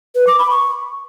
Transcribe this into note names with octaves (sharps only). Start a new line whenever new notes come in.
B4
D6
B5
C#6